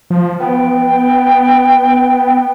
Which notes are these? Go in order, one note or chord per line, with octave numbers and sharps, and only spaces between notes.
F3
B3 G5